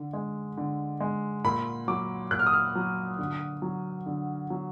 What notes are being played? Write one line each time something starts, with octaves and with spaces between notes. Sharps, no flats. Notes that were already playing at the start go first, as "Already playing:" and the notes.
Already playing: D3
G#3
D3
G#3
A#2 B5
F#3 D6
A#2 F#6
F6
D#6
F6
F#3
D3
F#3
D3
F#3